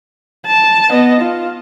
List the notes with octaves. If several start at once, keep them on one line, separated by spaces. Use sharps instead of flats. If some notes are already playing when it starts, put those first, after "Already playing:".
A5
B3 D#5
F4